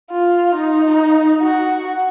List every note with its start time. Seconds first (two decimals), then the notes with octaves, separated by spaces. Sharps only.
0.11 F4
0.55 D#4
1.42 F#4